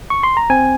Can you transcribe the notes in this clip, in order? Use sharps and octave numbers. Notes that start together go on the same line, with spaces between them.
C#6
C6
A#5
C4 G#5